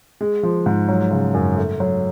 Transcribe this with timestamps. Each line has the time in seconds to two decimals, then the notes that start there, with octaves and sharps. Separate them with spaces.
0.21 G#3
0.43 F3
0.66 G#2
0.89 F#3
1.11 C#3
1.34 F#2
1.57 A3
1.80 F#3